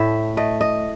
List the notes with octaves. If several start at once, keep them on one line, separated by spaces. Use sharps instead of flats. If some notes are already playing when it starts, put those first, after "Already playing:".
Already playing: A2 A3 E5
A3 D#5
D#5